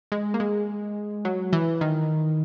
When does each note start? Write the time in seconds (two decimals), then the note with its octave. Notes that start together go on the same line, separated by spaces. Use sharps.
0.12 G#3
0.34 A#3
0.40 G#3
1.25 F#3
1.53 E3
1.81 D#3